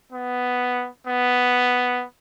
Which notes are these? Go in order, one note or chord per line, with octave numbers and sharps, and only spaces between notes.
B3
B3